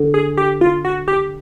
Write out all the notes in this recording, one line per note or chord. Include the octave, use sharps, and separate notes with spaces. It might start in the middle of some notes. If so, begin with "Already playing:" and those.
Already playing: D3
G#4
G4
F4
F#4
G4